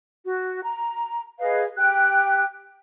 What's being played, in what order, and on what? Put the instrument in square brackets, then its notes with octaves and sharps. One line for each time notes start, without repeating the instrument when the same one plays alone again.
[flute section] F#4
A#5
G#4 B4 D#5 F5
G4 G5 F#6